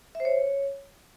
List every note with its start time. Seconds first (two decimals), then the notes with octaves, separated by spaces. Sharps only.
0.15 E5
0.20 C5
0.25 C#5